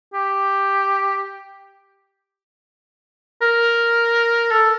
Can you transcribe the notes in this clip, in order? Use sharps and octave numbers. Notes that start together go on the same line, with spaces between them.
G4
A#4
A4